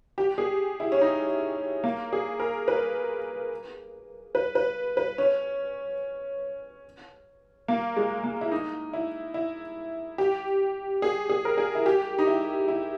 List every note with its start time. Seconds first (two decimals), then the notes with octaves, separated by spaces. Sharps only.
0.18 G4
0.38 G#4
0.80 E4
0.92 C#4
1.01 D#4
1.84 A#3
2.13 G#4
2.40 A#4
2.68 B4
4.35 B4
4.55 B4
4.97 B4
5.18 C#4
7.68 A#3
7.96 G#3
8.24 A#3
8.41 E4
8.51 D#4
8.93 E4
9.34 E4
10.18 G4
11.02 G#4
11.30 G#4
11.45 A#4
11.58 G#4
11.75 E4
11.86 G4
12.19 D#4
12.27 E4
12.68 E4